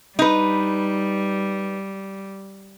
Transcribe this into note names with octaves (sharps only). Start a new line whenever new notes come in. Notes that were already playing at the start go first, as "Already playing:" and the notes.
G3 D#4 B4